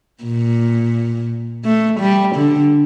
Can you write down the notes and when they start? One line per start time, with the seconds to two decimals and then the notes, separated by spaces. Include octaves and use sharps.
0.24 A#2
1.65 A3
2.00 G3
2.35 D3